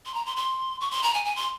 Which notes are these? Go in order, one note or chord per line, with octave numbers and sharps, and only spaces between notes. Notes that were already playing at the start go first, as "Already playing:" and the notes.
C6
A#5
C6
C6
C#6
C6
A#5
G#5
G#5
C6